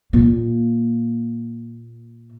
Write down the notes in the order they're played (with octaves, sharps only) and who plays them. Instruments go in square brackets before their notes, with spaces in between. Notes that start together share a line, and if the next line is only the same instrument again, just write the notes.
[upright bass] A#2 A#3